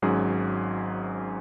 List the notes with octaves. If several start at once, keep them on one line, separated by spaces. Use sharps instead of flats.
G#1 G#2 F#3 C#4 G#4